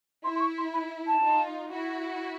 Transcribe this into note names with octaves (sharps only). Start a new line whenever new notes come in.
E4 C6
C6
C#6
C6
B5
A5
D#4 F4
E4 F#4